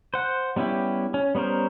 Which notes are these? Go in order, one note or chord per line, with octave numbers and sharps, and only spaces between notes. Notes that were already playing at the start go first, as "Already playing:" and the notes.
C5 F#5
G3 B3 C#4 E4 G4
C#4
G3 B3 C#4 A#4 C5